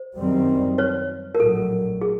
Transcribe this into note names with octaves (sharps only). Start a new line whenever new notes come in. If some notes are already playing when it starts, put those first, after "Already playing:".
Already playing: C5
F#2 D#3 G3 C4
B4 C#5
A#4
A#1 A2 F#3 A4
G#4